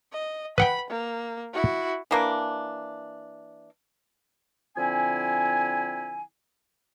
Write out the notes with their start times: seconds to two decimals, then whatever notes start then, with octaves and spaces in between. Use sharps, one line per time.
0.13 D#5
0.58 B4 F#5 G5 B5
0.90 A#3
1.53 E4 F#4
2.11 E3 A#3 D4
4.76 D3 F3 C4 E4 G#5